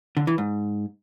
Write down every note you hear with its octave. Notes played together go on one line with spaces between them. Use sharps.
D3
E3
G#2